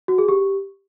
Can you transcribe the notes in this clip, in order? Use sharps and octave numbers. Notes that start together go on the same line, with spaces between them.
F#4
G#4
G4